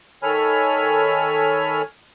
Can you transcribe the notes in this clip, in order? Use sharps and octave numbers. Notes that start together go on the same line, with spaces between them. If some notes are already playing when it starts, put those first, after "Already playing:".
D#3 A4 C#5 G#5 B5 F6